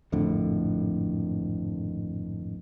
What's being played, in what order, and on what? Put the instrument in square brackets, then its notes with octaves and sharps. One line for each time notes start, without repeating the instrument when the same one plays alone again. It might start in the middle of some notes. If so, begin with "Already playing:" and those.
[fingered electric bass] G#1 F2 A2 D3